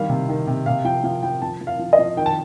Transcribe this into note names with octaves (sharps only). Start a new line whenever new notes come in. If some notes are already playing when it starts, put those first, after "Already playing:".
Already playing: D#3 G3 F5
C3
D#3
C3
C3 F5
F3 G5
F3 F5
F3 G5
F3 A5
F3
F5
F3
D#5
F3
D#3 G5
A5